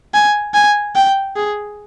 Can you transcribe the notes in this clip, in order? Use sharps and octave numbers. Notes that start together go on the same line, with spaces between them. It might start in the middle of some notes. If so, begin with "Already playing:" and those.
G#5
G#5
G5
G#4